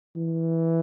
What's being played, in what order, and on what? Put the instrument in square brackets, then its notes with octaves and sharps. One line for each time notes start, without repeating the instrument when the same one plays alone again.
[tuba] E3